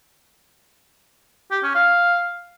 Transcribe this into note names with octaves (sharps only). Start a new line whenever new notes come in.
G4
C#4
F5